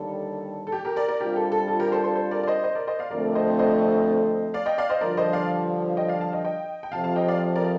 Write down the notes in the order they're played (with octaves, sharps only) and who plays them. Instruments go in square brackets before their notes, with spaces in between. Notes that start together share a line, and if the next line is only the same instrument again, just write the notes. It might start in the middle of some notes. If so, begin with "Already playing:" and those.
Already playing: [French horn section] D#2 D3 G3 [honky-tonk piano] A4
[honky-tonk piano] A4
G4
G4 A#4
A#4 D5
A#4 D5
[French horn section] C3 G3 D4 F4 [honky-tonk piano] G4 A#4
[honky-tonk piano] A4
A4
A4
G4 A#4
A4 C5
A4 C5
A4 C5
A#4 D5
D5
C5 D#5
C5 D#5
A#4 D5
C5 D#5
D5 F5
[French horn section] F2 D3 A3 C4 [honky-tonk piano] A#4 D5
[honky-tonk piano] C5 D#5
C5 D#5
D5 F5
D#5 G5
D5 F5
C5 D#5
[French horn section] G2 D3 F3 [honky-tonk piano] A#4 D5
[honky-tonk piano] C5 D#5
D5 F5
D#5 G5
D5 F5
F5 A5
D#5 G5
D#5 G5
G5
[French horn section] F2 C3 F3 [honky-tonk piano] F5 A5
[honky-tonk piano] F5 A5
D#5 G5
D5 F5
A#4 D5